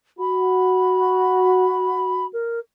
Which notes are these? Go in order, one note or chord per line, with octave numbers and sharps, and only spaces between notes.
F#4 B5
A#4